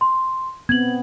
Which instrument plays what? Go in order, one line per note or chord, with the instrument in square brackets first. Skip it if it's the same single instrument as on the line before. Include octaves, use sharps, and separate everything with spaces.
[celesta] C6
[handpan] B3 C4 [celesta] G#6 F#7